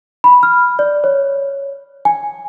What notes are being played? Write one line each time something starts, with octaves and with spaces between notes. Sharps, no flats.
B5
F6
D5
C#5
G#5